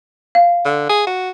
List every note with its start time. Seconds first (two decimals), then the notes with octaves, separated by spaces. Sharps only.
0.35 F5
0.65 D3
0.89 G#4
1.07 F#4